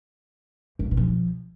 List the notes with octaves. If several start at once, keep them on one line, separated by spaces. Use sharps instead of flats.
G2
C3
B2
F3